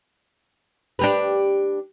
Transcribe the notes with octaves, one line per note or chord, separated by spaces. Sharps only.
D4 G4 B4